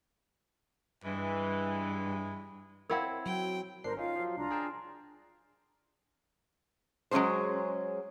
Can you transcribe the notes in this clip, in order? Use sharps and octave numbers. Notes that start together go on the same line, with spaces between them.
G2 E3 G#3
C4 E4 A#4 C#5 F5 F#5
F#3 G5
G1 D4 A#4 C5 C7
C#4 D#4 F4 F5
F3 F#3
C2 D4 F4 A#5
G#4 G5 A5
F#3 G#3 B3 C#4 G#4 C5